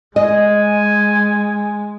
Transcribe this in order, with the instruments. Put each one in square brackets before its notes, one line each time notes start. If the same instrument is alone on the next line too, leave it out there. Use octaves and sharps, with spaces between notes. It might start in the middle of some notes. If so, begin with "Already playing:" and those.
[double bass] G#3 [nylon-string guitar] D#5 [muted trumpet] G#5